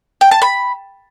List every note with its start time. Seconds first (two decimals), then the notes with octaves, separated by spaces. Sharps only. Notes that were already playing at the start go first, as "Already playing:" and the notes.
0.21 G5
0.31 A5
0.42 B5